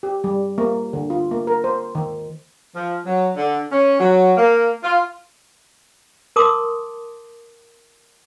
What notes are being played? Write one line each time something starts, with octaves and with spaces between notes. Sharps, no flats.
G4
G3
A#3
D3
F4
A#3
A#4
C5
D#3
F3
F#3
D3
C#4
F#3
A#3
F4
A#4 A5 C6 D6 D#6